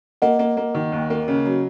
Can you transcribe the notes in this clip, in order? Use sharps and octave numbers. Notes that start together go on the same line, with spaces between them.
A#3 D#5 F#5
A#3
A#3
D#3
D#2
A#3
C#3
F#3